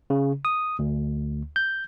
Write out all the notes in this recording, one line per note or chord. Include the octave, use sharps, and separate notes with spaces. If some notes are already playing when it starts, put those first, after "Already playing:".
C#3
D#6
D2
G6